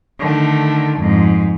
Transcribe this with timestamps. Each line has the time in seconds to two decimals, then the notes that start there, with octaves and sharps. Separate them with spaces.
0.18 D3 D#3 A3
1.00 F2 G#2